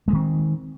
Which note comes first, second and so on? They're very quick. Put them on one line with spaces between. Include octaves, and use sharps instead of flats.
G#3 A3 D#3 C4